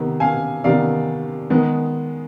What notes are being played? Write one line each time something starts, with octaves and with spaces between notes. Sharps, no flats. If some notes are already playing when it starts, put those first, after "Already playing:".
Already playing: C3 D#3 B3
F5 G#5
C3 D#3 B3 D5 F5
D#3 G#3 B3